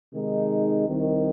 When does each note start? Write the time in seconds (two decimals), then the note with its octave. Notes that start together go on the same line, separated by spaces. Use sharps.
0.13 C3 D#3 G#3 D#4
0.88 C2 C3 D#3